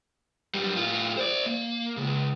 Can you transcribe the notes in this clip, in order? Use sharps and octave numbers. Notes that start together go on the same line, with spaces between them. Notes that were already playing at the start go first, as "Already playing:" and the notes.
F#2 G3
A2 F4
C5 D5
A#3
C#2 C#3